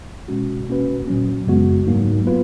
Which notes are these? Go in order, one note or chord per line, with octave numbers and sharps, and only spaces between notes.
B2 G#3 C#4 F#4
B2 A#3 C#4 F#4 B4
A#2 F#3 C#4
F#2 C#3 G#3 B3 F#4
G#2 F#3 A#3 D#4
B3 F4 B4